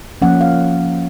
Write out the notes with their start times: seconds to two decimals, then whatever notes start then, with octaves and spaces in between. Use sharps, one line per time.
0.22 F3 A#3 C#4 F#5
0.41 F5